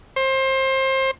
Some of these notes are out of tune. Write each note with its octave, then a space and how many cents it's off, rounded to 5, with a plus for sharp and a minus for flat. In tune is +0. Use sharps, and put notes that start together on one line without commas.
C5 +25